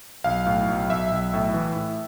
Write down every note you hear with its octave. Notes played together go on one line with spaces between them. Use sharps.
B1 F5
A2
B1
B1 E5
B1
A2
E3
A2